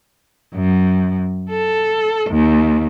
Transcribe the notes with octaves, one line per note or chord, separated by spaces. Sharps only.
F#2
A4
D#2